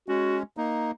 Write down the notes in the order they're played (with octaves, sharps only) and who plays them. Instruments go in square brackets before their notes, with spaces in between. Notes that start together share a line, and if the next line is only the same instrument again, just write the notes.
[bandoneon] G#3 C#4 [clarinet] F#4
[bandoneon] A#3 D#4